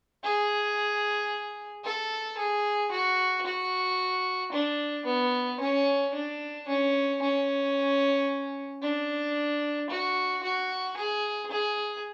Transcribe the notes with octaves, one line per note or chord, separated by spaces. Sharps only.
G#4
A4
G#4
F#4
F#4
D4
B3
C#4
D4
C#4
C#4
D4
F#4
F#4
G#4
G#4